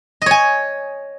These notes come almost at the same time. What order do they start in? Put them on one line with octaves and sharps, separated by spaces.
D#5 C#5 G#5